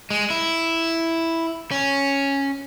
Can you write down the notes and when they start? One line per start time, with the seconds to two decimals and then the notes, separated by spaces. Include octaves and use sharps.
0.10 G#3
0.30 E4
1.71 C#4